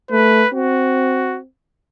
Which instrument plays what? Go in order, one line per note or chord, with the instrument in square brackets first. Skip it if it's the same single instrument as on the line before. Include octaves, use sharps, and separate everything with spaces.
[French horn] A3 [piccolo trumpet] B4
[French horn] C4 [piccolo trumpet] F#4